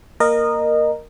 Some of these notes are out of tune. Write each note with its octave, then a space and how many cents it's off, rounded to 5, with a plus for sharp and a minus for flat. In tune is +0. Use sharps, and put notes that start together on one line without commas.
A#3 +0 A#4 +0 D#5 -20